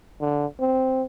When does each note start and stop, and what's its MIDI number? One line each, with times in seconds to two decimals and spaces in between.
0.21 0.45 50
0.60 1.03 60